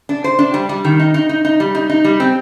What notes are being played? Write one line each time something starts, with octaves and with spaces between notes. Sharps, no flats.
D4
C5
D4
G3
G3
D#3
D#4
D#4
D#4
D#4
G3
D#4
D#4
G3
C4